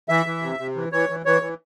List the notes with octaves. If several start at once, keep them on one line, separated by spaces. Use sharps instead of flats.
E3 E5
E3
C3
C3
E3
E3 C#5
E3
E3 C#5
E3